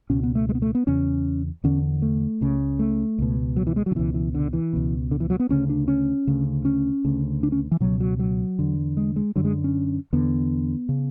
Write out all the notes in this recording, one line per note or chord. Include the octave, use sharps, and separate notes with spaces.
C#2 B2 C#4
B3
A3
G#3
B3
A3
B3
E2 C#3 C#4
E2 D3 C#4
A3
C#2 C#3
A3
C#2 B2
F#3
E3
G#3
F#3
D3
C#2 B2 E3
E3
D3
E3
C#2 B2
D3
E3
F#3
B3
D2 C#3 C#4
D4
C#4
D2 C#3
C#4
D2 C#3
D4
C#4
E3
C#2 B2 F#3
F#3
F#3
E2 D3
G#3
G#3
F#2 D3 F#3
G#3
C#4
E2 D3 B3
C#3